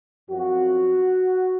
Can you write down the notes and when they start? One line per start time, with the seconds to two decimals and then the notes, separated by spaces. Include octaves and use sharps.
0.29 F#2 F3 C4 F#4